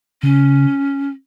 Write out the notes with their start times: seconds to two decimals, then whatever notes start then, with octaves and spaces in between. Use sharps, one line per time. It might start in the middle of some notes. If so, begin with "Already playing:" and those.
0.23 C#3 C#4